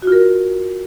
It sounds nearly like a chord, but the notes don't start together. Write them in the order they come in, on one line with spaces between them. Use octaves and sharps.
F#4 F4 A#4